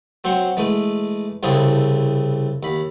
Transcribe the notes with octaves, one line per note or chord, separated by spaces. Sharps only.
F#3 C4 C5 C6 C#6
E3 G#3 A3
C2 C#3 C4 E4 G#4 A4
D#2 B5